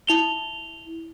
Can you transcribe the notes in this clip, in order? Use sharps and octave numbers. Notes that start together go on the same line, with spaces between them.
E4 F7 G7